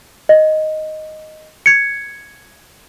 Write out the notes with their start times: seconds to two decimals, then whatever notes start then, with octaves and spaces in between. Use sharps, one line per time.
0.29 D#5
1.66 G#6 C#7